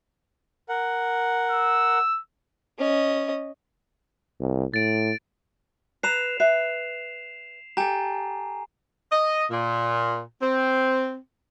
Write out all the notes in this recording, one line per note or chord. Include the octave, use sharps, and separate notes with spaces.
A#4 F#5
E6
C#4 D#5
C2
A2 A6 D7
B4 A#5 C7 E7 F7
B4 E5 C7
G4 A4 G#5 A#5
D#5
A#2
C4